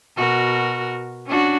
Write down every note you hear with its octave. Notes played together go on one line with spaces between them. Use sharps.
B2 F#4 A#4
C#4 D4 F#4